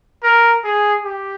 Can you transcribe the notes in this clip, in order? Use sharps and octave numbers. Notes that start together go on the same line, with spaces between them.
A#4
G#4
G4